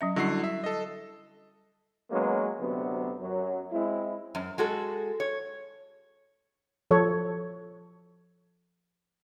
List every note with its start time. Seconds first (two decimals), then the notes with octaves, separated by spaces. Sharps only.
0.01 F#3 C#4 E5
0.16 D3 G3 C#4 E4 F#4 C7
0.44 E5
0.64 A4 D#5
2.11 F#3 G#3 A#3 B3 C#4
2.60 D2 C3 F#3 B3
3.20 F#2 F#3
3.72 G#3 C4 E4
4.35 F#2
4.58 G#3 F#4 A4
5.20 C#5
6.91 F3 A4 C#5